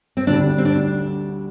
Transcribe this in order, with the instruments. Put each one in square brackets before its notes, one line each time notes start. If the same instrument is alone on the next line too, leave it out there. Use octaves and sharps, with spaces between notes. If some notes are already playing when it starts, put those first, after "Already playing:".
[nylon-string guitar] C4
[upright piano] D2 D3 G3 [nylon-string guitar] D4
[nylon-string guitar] C4
D4